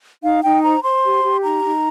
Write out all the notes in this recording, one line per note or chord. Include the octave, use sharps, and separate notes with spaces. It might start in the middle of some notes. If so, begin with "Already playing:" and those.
D#4 F5
D#4 G5
C5 A#5
C5 C6
G4
G4
D#4 A#5
D#4